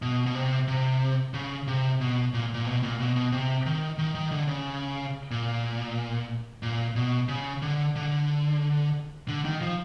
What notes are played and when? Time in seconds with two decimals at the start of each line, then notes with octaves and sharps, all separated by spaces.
0.02 B2
0.26 B2
0.35 C3
0.68 C3
1.34 C#3
1.67 C3
2.01 B2
2.34 A#2
2.54 A#2
2.66 B2
2.83 A#2
3.00 B2
3.16 B2
3.32 C3
3.66 D#3
3.98 D#3
4.15 D#3
4.31 D3
4.48 C#3
5.31 A#2
6.63 A#2
6.96 B2
7.29 C#3
7.62 D3
7.96 D3
9.28 D3
9.45 D#3
9.61 F3